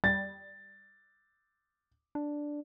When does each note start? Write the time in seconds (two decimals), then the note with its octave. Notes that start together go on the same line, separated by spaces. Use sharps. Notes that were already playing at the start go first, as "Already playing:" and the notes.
0.04 G3 A6
2.15 D4